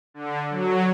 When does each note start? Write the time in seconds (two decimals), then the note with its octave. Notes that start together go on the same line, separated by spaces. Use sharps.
0.14 D3
0.50 F#3